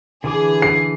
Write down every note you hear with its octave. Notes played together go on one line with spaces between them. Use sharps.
D3 E3 G#4 D6
C7